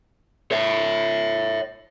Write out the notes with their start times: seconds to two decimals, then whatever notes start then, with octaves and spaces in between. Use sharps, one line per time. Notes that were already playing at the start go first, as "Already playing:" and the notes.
0.51 C#5 E5